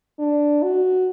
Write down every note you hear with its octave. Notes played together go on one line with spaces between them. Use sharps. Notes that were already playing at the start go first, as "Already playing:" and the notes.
D4
F#4